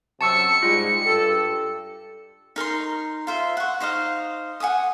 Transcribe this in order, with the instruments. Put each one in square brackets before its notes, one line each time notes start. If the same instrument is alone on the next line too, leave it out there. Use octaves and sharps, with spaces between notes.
[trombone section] F#2 C3 F#3 [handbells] A5 C#6 E6 [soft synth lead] C#7
[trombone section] G#2 G3 G#3 [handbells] F4
[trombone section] G2 G4 A4
[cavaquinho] D#4 A#4 A#5 C6
F4 C5 E5
F#5 C#6
D#4 C5 D#5 F5
F#5 G#5 D6 D#6